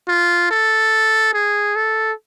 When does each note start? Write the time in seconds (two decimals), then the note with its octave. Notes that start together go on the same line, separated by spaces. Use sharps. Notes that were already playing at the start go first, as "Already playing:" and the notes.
0.08 F4
0.51 A4
1.34 G#4
1.76 A4